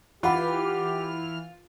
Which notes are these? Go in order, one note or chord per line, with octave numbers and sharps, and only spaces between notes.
E3 F4 G4 F#5 B5 F6